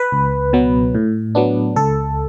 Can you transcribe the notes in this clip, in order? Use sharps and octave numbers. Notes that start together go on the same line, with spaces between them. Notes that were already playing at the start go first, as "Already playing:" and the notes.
Already playing: B4
C#2
B2 F#3 B3
A2
F#3 B3 D4
C#2 A4